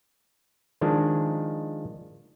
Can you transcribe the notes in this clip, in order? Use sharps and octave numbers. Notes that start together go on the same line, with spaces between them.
D#3 F3 G#3 D4